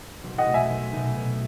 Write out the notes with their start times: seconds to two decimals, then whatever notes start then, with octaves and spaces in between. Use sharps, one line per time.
0.23 B1
0.38 D#5 F#5
0.46 B2 A3 D#4
0.54 E5 G#5
0.70 B1
0.93 B2 A3 D#4
1.16 B2